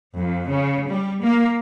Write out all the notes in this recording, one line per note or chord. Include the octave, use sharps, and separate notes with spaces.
F2
C#3
G3
A#3